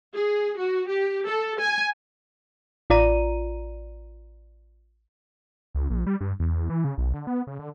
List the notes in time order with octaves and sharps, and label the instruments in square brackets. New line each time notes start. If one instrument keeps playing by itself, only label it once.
[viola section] G#4
F#4
G4
A4
G#5
[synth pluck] A1 F4 D5 A#5 D#7
[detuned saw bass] C#2
A#1
G3
G2
E2
E3
C#3
B1
D3
B3
C#3
D3